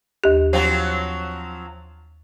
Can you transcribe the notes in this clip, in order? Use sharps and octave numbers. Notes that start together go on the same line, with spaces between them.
D#2 G4
F3 F#3 C4